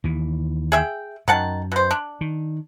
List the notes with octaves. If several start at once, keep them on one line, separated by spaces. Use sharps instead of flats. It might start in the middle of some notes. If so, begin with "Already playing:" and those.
D#2 E3
G#4 E5 G5
F#2 D#3 F#5 A5
B2 C5
D4
D#3